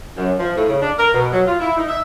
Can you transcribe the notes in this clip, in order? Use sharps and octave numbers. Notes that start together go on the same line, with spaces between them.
F#2
F3
A2
C#3
D4
A#4
B2
F#3
F4
E4
D#4
E5